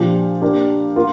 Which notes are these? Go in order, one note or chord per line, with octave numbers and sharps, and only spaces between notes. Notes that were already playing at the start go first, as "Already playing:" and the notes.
Already playing: A#2 F3 D4 G4
A#3 D4 G4
A#3 F4 A#4